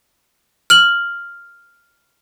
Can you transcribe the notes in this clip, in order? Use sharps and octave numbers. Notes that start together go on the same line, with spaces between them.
F6 F#7